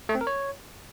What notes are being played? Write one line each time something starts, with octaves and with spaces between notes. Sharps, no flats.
A3
C4
A#4
C#5